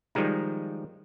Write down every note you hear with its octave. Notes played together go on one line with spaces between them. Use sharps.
D#3 F3 G3 G#3 D#4